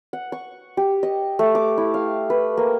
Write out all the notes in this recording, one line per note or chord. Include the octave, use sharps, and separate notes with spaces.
F#5
C#6
G4
D#5
A3
D6
E4
F5
B4
A#3